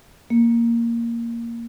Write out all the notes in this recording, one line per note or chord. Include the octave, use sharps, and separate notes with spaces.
A#3